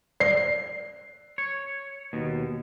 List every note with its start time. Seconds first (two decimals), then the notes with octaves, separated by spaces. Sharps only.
0.20 D5 C7
1.38 C#5
2.13 D#2 B2